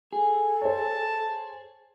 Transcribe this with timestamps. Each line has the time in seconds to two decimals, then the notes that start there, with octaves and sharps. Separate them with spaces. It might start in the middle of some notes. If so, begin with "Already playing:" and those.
0.13 G#4 A4
0.62 C5 C#5 A5